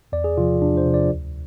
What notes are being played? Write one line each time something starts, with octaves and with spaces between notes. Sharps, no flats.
E2 D5
G#4
C3 F3 F4
E2 D4
C5
C3 F3
D5
D2